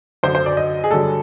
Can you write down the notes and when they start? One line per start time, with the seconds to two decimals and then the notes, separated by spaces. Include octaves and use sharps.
0.23 F#2 D3 F#3 C5
0.35 C5
0.46 D5
0.57 D#5
0.84 G#4
0.91 G2 D3 F#3 A4